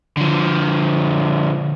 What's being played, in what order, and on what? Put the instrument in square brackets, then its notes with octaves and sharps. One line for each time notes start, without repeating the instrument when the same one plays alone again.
[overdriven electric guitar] D3 F3